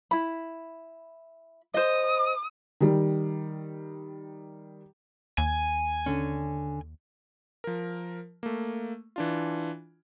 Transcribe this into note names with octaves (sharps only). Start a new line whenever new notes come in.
E4 B5
C5 D#5 D#6
D#3 G3
D#2 G#5
D3 C#4
F3 A#4
A3 A#3
E3 D4 F4